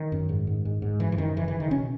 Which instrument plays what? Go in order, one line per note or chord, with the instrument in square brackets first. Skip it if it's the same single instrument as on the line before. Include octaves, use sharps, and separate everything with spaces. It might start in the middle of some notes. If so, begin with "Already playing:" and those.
Already playing: [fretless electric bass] D#3
F#2
G#2
G#2
G#2
G#2
F#2 E3
E3
F#2 D#3
C#3 E3
E3
C#3
D#3
B2 C#4